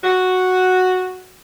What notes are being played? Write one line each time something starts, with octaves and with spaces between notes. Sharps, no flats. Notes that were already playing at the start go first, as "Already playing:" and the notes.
F#4